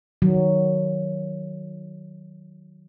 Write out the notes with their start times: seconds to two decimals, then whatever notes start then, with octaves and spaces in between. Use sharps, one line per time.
0.22 D#3 F#3